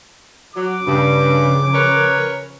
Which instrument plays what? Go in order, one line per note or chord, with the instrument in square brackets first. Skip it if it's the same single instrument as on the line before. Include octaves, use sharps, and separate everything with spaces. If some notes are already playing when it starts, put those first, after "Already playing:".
[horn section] F#3 [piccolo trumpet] D6
[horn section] G2 [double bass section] C#3 F3
[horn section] A#4 B4 C#5